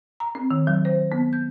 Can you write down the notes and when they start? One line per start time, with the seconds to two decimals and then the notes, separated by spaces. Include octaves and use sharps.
0.20 A#5
0.35 C4
0.51 D#3
0.67 F#3
0.85 C5
1.12 B3
1.33 G6